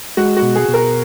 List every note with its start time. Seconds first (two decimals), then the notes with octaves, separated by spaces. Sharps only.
0.17 G#3 F#4
0.37 F#4
0.42 B2
0.55 G#4
0.68 B2
0.74 A#4